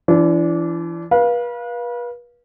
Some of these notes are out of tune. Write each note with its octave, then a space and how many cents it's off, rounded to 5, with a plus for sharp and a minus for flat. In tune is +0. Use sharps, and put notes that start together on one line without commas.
E3 +35 D4 -15
B4 -35 F5 +0